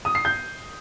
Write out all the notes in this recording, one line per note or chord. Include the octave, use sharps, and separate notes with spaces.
D#6
C7
G6